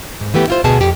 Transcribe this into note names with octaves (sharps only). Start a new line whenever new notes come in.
G#2
E3 A3 B3 G4
E4 F4 C5
D2 B2 B3 G#4 A5
F2 G4